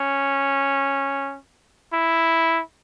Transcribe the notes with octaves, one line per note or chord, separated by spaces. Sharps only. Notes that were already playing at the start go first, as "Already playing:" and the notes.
Already playing: C#4
E4